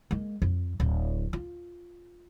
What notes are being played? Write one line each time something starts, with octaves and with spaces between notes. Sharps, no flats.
G#3 A#3
F2
D1
F4